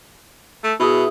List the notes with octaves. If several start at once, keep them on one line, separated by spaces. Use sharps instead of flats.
A3
B2 E4 G#4